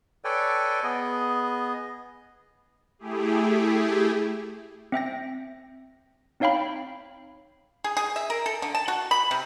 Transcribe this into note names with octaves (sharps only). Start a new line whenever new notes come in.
A4 B4 C#5 D5 G5 G#5
B3 G#4 D#5
A3 E4 G4 G#4
C4 E5 G5 A#6
C4 D#4 C#5 F5 G5 B5
G#4
G#4
E5
A#4
A4
D3
A5
F#4
B5
C3